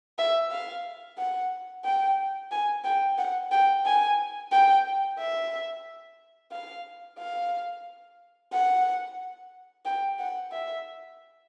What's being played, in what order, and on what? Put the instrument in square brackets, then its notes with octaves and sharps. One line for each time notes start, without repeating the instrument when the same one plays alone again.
[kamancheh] E5
F5
F#5
G5
G#5
G5
F#5
G5
G#5
G5
E5
F5
F5
F#5
G5
F#5
E5